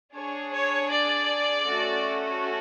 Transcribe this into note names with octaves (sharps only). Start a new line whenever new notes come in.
D4 G#4 C#5
C#5
D5
A3 C#4 F#4 A4